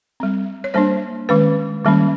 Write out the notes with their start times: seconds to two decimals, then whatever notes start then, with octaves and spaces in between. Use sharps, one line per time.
0.20 G3 C4
0.64 C#5
0.74 G3 A#3 D4 C5
1.29 D#3 G#3 C#4 B4
1.85 D#3 G3 A#3 C#4